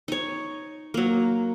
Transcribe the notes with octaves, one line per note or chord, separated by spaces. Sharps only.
D#4 C#5
F#3 A#3